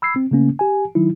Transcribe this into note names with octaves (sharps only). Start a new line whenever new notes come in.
B5 E6 G#6 C7
C4
C#3 A3 A#3 C#4
G4 G#5
D#3 F#3 D#4 E4